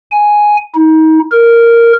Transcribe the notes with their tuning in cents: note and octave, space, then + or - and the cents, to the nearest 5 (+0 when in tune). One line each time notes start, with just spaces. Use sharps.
G#5 +5
D#4 +30
A#4 -5